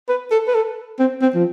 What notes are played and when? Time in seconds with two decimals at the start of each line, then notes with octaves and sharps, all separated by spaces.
0.09 B4
0.31 A4
0.48 B4
0.55 A4
0.99 C4
1.22 C4
1.35 F3